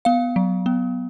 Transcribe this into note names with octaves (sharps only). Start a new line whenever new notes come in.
B3 F5
F#3
B3